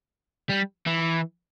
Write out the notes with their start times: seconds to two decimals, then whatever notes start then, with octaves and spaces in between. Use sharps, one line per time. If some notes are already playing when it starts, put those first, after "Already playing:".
0.49 G3
0.87 E3